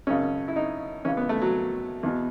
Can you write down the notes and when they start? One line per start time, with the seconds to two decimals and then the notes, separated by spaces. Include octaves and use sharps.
0.07 G#1 F#2 C#3 C#4
0.48 E4
0.56 D#4
1.05 C#2 C#3 E3 C#4
1.17 B3
1.29 A3
1.42 F#3
2.03 E2 B2